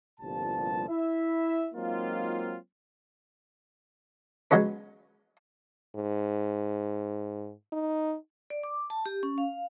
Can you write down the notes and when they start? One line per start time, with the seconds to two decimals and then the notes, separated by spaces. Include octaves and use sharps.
0.20 G1 C2 A#2 F3 G3 A5
0.89 E4 E5
1.75 F#3 G#3 A#3 C4 D#4 F4
4.51 F#3 G#3 B3 C#4 B4
5.95 G#2
7.73 D#4
8.50 D5
8.63 D6
8.90 A5
9.06 G4
9.23 C#4
9.38 F5